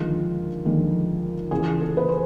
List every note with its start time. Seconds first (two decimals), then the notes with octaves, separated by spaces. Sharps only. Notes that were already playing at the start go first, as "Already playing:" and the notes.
Already playing: D#2 D3 F3 G#3 F4
0.65 D#2 D3 F3 G#3
1.51 E2 C#3 E3 G#4
1.80 A4
1.97 B4
2.09 C5